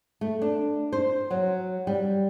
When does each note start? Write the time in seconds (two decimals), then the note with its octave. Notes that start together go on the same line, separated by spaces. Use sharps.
0.21 A3
0.42 D4
0.92 C5
1.31 F#3
1.87 G3